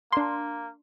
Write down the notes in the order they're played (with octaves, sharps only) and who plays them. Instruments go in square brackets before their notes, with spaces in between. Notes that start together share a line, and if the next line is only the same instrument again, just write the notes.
[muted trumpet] A#3 [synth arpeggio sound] D4 C6